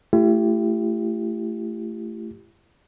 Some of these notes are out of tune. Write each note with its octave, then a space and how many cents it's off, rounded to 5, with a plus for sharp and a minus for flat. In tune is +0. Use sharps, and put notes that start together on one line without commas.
A3 +0 E4 +40 G4 +0